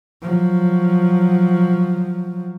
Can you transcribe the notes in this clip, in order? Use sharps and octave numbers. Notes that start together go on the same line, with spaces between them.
F3 F#3